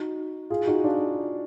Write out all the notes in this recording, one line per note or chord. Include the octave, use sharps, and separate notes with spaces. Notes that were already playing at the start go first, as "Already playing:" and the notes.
Already playing: D#4 F#4
F4 G#4
D#4 F#4
D4 F4